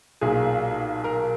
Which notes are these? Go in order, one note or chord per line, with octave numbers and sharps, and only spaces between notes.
B1 A#2 G#4
A#4